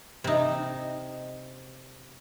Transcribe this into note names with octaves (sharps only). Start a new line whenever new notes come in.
C3 D#4